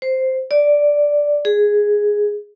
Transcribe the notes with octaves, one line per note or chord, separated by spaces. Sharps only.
C5
D5
G#4